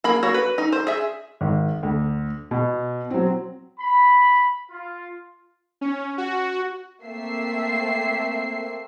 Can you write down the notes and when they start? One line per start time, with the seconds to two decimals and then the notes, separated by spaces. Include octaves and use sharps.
0.04 A#3 G#4 B5
0.23 A#3 F#4 C#5
0.34 B4
0.58 D#4
0.72 C5
0.87 G#4 E5
1.41 G#1
1.83 D2
2.51 B2
3.10 F#3 C4
3.79 B5
4.71 F4
5.81 C#4
6.18 F#4
7.03 A3 A#3 C4 E5 C7